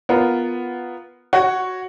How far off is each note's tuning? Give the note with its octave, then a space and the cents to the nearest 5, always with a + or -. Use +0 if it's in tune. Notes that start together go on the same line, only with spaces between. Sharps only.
B3 +0 F4 +0 A#4 +0
F#4 +0 C#5 +0